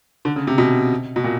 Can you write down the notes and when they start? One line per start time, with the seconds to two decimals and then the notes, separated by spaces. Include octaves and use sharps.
0.25 D3
0.36 C#3
0.47 C3
0.58 B2
1.16 B2
1.24 A#2